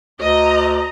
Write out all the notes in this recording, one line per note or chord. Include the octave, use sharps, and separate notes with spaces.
D2 D#5 A#5